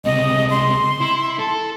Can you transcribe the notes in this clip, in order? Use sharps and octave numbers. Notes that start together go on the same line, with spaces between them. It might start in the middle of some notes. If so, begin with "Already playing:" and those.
C#2 C3 D#5
C6
E4
A4